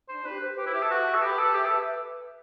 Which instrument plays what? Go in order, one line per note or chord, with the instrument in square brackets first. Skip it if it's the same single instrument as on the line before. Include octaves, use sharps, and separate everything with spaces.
[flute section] D4 [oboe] C5
[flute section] G4 [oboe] B4
[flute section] C5
[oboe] G4 [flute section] B4
[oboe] E4
[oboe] G4 [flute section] E5
[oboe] A4
[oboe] F#4 [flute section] E5
[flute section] B4
[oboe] A4
[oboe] G4 [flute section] B5
[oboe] A4 [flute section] B4
[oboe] G4 [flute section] E5
[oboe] A4
[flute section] B4